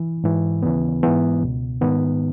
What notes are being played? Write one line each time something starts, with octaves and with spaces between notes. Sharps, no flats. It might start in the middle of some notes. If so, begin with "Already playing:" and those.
Already playing: E3
G#2 E3
D#2 C#3 E3 B3
G#2 E3 B3
C#2 B2
G#2 D#3 B3